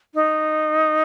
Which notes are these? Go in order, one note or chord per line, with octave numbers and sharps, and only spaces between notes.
D#4